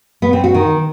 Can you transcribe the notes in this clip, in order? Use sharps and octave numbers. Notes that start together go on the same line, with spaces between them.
B3
C4
F#4
D#3